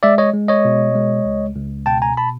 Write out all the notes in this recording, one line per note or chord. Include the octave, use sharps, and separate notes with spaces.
G#3 D5 E5
C#5 D#5
G#3
C#5 D#5
B2
G#3
C#2
C#2
B2 G5 A5
G#5 A#5
A5 B5